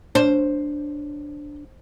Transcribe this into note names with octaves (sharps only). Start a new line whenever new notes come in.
D4 C5